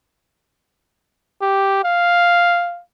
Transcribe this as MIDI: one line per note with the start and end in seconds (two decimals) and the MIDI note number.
1.42 1.83 67
1.84 2.81 77